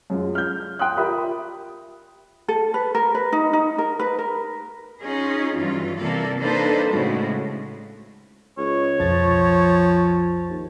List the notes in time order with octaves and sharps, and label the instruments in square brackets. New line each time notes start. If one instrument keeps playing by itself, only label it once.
[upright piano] F#2 G#3 F4
F6 G6
G5 C6 D#6 F#6
F4 G4 A#4 E5 B5 D#6
[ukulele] A4
B4
A#4
B4
D#4
D#4
A#4
B4
A#4
[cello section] C#4 D#4 F4 G#4
G2 E3 F#3 F4
C3 E3 A#3 A4 D5
A#3 D4 D#4 A4 B4 C5
A2 C#3 G#3 F#4
[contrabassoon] C#2 [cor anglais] C#5
[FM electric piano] B1 F2 A6 [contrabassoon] F3
[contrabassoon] D#2